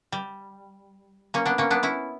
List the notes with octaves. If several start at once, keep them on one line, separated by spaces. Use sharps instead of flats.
G3
A#3 C#4
B3 D4
A#3 C#4
B3 D4
C#4 E4